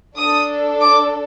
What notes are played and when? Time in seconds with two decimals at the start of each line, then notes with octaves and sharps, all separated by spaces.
0.17 D4 A4 D#6
0.81 D6